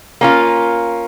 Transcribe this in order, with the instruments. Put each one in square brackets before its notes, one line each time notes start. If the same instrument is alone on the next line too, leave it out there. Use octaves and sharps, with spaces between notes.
[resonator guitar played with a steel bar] A#3 C#4 F4